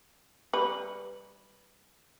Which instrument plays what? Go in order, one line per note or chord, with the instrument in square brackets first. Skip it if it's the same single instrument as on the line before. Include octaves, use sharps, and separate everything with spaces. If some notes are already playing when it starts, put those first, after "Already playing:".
[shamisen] G3 B4